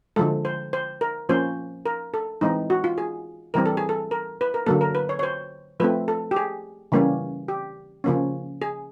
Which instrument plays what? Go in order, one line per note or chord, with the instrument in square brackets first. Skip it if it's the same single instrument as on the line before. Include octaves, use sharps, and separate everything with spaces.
[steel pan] D3 F3 G#3 A4
C5
C5
A#4
F3 A#3 C#4 C5
A#4
A4
E3 G#3 C4 D#4
F#4
F4
G#4
E3 G3 C4 A#4
A4
G#4
A4
A#4
B4
A#4
D3 F#3 A#3 A4
A#4
B4
C#5
C#5
C5
F3 A3 C4 B4
A4
G4
G#4
C#3 E3 G3 A#3 C#4
G4
C#3 F3 A#3 C#4
G#4